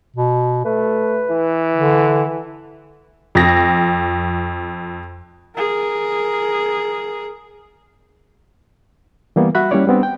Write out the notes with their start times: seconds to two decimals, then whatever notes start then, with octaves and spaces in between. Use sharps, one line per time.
0.16 B2
0.65 A3 B4
1.30 E3
1.75 D3
3.35 F2 A#6
5.55 G#4 A#4
9.36 E3 G3 A#3 B3
9.55 G3 F#4 E5 B5 F#6
9.71 G3 A#3 C#4 E4 C#5 D5
9.87 G3 B3 C4 D4
10.03 G5